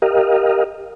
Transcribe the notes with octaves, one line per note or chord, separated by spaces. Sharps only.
G4 A#4 D#5 F5